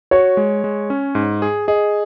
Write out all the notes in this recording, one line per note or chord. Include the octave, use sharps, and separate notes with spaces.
F#4 C#5
G#3
G#3
C#4
G#2
G#4
G#4 D#5